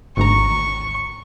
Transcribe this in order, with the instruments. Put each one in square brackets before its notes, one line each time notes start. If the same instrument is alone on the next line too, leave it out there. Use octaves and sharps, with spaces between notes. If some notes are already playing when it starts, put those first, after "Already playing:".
[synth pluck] G#1 D2 A#5 [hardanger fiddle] C#6